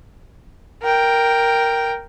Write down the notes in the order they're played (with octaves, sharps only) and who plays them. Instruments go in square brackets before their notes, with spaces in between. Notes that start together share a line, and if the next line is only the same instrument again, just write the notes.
[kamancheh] A#4 G5